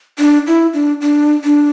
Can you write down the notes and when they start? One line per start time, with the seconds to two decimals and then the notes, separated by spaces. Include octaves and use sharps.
0.19 D4
0.47 E4
0.74 D4
1.01 D4
1.44 D4